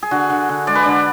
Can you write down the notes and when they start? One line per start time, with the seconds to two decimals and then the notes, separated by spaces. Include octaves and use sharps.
0.03 G#4
0.11 D3 F#4
0.30 D3
0.49 D3
0.67 G#3 D5
0.75 B4
0.83 D3 D5